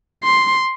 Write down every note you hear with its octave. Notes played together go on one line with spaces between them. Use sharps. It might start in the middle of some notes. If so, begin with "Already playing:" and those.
C6